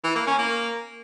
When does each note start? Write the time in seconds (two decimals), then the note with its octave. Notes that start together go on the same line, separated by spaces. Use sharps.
0.04 E3
0.16 A#3
0.27 C#4
0.39 A#3